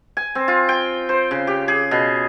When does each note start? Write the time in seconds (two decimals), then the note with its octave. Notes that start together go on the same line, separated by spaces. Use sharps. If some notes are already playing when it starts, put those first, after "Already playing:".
0.17 G#5
0.35 C4
0.48 F4
0.69 G5
1.09 C5
1.31 C#3
1.47 G4
1.68 G#4
1.91 B2